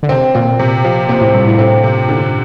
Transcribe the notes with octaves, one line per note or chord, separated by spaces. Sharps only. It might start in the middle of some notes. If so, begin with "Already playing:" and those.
D3
C3 C4
A#2 C4
C3
F3
A#2 C4
A2
G2 C3
A2
A2 C4
C3
D3